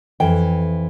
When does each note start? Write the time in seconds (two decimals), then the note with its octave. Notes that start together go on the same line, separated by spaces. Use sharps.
0.20 F2 E3 G5